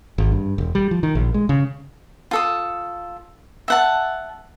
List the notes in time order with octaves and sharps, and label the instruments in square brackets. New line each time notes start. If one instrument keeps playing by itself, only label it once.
[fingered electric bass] G#1
G2
E1
G3
F3
D#3
A#1
G#3
C#3
[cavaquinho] F4 A4 D#6
E5 F#5 A5